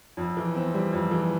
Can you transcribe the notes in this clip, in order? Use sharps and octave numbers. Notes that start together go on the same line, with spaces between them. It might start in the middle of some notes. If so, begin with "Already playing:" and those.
F2
E3
C4
G3
F2
E3